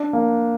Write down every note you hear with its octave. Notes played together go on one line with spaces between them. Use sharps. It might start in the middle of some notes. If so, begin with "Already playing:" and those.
Already playing: D4
A#3